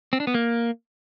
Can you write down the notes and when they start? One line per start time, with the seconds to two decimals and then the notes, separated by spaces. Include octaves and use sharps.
0.13 C4
0.20 D4
0.27 B3
0.34 A#3